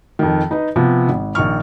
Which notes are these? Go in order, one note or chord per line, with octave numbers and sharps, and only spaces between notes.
F2 D#3
D#4 B4 D#5
C3 F3 B3
G#1
A#1 D#3 C#6 F6